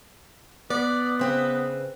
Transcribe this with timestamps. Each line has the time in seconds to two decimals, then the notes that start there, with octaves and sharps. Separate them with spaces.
0.70 B3 D5
1.19 C#3 C4 B4